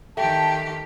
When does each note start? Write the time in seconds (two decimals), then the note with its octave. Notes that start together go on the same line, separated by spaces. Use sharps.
0.17 D#3 A3 G4 G5 A5